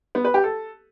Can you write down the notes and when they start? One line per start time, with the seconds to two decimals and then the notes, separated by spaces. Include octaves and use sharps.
0.15 B3
0.25 B4
0.34 G4
0.44 A4